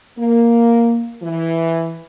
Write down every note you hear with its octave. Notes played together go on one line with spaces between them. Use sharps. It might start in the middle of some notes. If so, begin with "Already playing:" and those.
A#3
E3